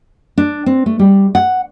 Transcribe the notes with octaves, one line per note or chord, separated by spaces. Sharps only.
D4
C4
A3
G3
F#5